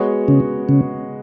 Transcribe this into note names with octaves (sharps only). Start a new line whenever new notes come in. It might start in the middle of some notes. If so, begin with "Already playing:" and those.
Already playing: G#3 B3 F#4 C#5
C#3
C#3